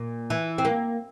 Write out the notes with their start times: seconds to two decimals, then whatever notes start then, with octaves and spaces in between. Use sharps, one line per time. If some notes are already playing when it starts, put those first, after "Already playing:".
Already playing: A#2
0.30 E3
0.58 C4
0.65 A#3